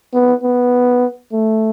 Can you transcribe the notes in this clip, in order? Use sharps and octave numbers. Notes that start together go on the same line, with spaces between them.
B3
B3
A3